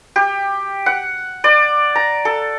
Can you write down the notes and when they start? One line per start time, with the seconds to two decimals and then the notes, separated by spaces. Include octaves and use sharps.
0.16 G4
0.86 F#5
1.44 D5
1.95 A#5
2.25 A4